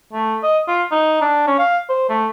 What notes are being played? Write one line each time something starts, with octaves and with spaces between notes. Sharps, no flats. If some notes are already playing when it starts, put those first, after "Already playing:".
A3
D#5
F4
D#4
D4
C#4
F5
C5
A3